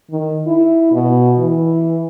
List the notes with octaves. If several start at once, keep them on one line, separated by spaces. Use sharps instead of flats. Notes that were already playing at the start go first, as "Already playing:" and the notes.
D#3
E4
B2
E3